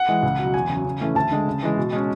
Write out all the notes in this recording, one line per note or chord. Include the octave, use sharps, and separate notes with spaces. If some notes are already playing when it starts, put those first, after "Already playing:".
Already playing: F#5
E3 G#3
C#2
B2
F#3
E2 G#5
C#3 F#3
C#3
E3 A3 C#4
D2 A5
D3 G#3
C#3
E3 G#3
B2
G#3 C#4